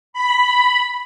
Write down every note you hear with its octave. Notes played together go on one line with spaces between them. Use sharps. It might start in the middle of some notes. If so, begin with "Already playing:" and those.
B5